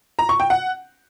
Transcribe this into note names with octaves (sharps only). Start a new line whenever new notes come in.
A#5
C#6
G5
F#5